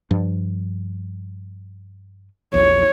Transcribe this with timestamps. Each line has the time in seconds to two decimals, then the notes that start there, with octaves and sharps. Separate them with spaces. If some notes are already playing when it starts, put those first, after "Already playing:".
0.11 G2 F3
2.54 A#1 E2 C#5